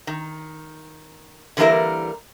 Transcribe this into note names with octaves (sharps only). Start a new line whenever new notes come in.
D#3
D3 E3 G3 A#3 E4 A#4